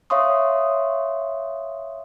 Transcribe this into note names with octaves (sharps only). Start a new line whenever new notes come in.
C#5 E5 F5 C6 C#6 D#6